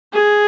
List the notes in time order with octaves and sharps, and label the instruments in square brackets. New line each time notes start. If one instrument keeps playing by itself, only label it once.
[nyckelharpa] G#4